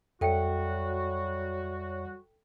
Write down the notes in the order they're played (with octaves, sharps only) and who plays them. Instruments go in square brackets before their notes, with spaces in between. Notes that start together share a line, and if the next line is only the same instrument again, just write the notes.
[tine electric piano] F2 E5 C#7 [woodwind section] F#3 G3 F#4 [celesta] A4 G5